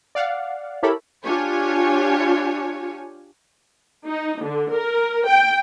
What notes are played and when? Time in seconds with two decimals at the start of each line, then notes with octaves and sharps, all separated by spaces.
0.15 D5 F5 F#5
0.83 E4 G4 A4 A#4 C#5 B5
1.23 D4 F4 G4 C#5 G#5
4.06 D#4
4.43 D3
4.74 A#4
5.27 G5